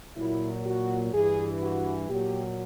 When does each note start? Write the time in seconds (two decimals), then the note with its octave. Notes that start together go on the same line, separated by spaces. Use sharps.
0.16 A#2 F#3 E4
0.64 F#4
1.12 G2 E3 G#4
1.61 F#4
2.08 A#2 F#3 G4